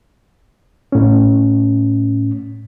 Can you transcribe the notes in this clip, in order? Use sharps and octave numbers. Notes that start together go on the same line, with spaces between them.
A2 C#4